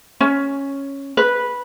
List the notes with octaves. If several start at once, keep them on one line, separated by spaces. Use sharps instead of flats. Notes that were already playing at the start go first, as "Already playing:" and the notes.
C#4
B4